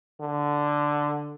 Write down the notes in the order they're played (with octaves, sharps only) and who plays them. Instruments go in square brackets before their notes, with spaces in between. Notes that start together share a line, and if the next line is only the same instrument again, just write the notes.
[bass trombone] D3